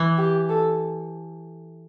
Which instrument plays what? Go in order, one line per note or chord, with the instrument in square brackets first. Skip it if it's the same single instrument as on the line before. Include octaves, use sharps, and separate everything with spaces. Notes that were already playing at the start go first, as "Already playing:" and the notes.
Already playing: [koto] E3
[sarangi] G4
A4